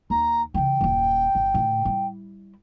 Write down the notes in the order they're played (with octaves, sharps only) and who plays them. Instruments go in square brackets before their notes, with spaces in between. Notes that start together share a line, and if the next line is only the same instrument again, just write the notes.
[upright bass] D#2 [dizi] A#5
[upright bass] C#3 E3 [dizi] G5
[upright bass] D#1 F#2
G1
A2 D3
G3 E4